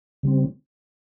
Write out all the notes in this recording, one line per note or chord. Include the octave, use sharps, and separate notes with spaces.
C#3 G3 C4